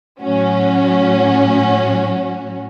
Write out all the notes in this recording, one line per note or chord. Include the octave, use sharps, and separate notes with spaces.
A2 F#3 C#4 F#4